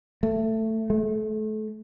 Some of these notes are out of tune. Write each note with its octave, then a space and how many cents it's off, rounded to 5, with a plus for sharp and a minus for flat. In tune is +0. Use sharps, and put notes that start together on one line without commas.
A3 +10
A3 -30